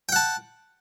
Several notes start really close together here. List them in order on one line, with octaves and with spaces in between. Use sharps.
G5 F#5 A5